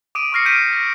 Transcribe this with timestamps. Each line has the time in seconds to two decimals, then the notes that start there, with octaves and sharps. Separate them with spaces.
0.15 D6 D#6 D7 D#7
0.32 C#6 D6 F6 A#6 C7 C#7
0.45 F6 G6 B6 D7 D#7
0.73 A#6 C#7